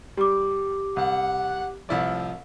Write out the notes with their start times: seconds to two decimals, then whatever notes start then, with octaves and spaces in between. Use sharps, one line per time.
0.17 G3 G4 D6
0.96 C2 F#5
1.89 C2 A2 F3 E4 D5